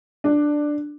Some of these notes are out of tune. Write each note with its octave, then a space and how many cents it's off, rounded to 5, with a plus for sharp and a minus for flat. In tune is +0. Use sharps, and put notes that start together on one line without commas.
D4 +5